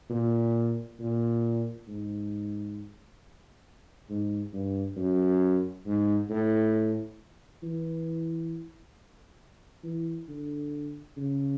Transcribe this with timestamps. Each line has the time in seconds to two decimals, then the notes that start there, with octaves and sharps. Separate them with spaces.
0.10 A#2
1.00 A#2
1.88 G#2
4.09 G#2
4.53 G2
4.97 F#2
5.86 G#2
6.30 A2
7.63 E3
9.84 E3
10.28 D3
11.17 C#3